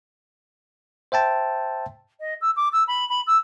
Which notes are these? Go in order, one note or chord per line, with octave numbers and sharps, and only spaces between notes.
C5 E5 G5 A5
D#5
E6
D6
E6
B5
B5
E6